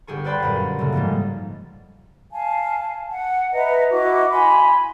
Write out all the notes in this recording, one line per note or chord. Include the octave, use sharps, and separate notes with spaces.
G1 G4 G#4 C#6
B4 C5 D5 G5 B5 C6
F#2 A#2
C#3 A3 A#3
G#2 F3 G3 G#3
F5 G#5 A5
F#5
B4 D#5 E5 A#5
E4 F#4 D#5 D6
G#5 B5 C6